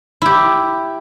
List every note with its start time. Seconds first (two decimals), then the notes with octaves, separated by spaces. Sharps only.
0.22 E4 G4